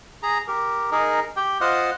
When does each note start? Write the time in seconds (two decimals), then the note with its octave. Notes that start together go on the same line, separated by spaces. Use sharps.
0.23 G#4 A#5
0.48 G4 A#4
0.92 D#4 G#4 A#4
1.36 G4 G5
1.61 F4 C5 D#5 F5 F#5